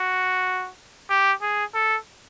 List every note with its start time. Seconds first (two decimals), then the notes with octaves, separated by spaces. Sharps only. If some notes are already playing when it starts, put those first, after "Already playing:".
Already playing: F#4
1.10 G4
1.42 G#4
1.75 A4